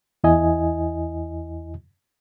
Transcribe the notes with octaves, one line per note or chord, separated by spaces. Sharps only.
E2 E4 D#5 G#5